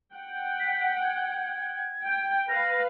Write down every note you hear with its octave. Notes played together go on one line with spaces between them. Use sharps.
F#5 G5
B6
G#6
G5
B4 F5 A#6